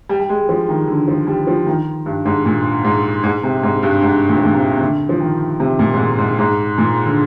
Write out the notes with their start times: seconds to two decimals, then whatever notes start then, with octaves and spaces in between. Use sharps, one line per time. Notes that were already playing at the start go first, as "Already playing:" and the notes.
0.09 G3
0.20 G3
0.29 G#3
0.49 F3
0.69 D#3
0.88 D3
1.08 F3
1.27 G3
1.47 F3
1.67 D#3
2.06 G2
2.25 G#2
2.45 A#2
2.84 G#2
3.23 G#2
3.43 C3
3.63 G#2
3.83 G2
4.02 G#2
4.29 A#2
4.37 G#2
4.45 A#2
4.55 C3
4.76 C3
4.81 D3
5.09 F3
5.20 D#3
5.60 C3
5.79 A#2
5.94 G#2
5.99 A#2
6.18 G#2
6.38 G#2
6.78 A#2
7.06 D3